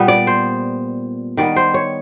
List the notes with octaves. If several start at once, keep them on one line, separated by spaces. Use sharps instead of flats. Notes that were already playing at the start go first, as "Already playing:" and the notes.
Already playing: A#2 G3 B3
D5
C5
D#3 G3 B3 D5
C5
C#5